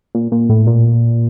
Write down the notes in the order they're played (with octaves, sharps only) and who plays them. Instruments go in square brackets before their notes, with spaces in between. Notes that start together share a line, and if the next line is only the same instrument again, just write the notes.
[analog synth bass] A#2
A#2
A2
A#2